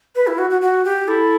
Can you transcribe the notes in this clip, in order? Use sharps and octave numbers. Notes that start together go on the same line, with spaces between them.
B4
E4
F#4
F#4
F#4
G4
E4 A4